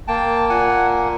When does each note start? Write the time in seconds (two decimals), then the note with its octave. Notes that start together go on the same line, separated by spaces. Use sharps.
0.08 A#3 G5 A5
0.49 A#2 F#5 G#5